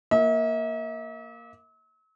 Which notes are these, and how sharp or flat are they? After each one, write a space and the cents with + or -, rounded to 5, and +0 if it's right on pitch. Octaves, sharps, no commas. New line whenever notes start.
A#3 +0 E5 -45